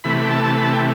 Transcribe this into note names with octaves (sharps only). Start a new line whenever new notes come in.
C3 E3 A3 B5
B5
G5
A5
A5
B5
A5
G5